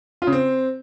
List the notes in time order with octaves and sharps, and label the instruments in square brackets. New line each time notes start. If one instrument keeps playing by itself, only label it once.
[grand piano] F4
C#3
C4